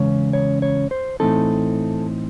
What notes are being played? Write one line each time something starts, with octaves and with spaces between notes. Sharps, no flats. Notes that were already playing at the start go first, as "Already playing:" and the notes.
Already playing: E2 C#3 G#3 C#4 C#5
C#5
C#5
C5
A2 E3 C4 D#4 A4